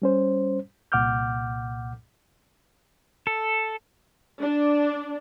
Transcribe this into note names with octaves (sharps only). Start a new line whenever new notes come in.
G3 C#4 C5
C2 A#2 F#5 D6 F6 G6
A4
D4